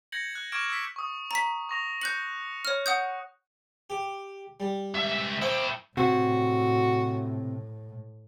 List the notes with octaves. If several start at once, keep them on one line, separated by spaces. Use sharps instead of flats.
G6 G#6 A#6 C#7 F#7
F#6
C#6 D6 F6 G#6 D7 E7
E6 B6
C#6 D#6
A#5 B6
C#6 A#6 F7
F#6 G6 A#6 C#7 F#7
C#5 F6
F#5 D#6 G6
G4
G3
C#2 E5
E4 C5 G5
A2 C3 F#4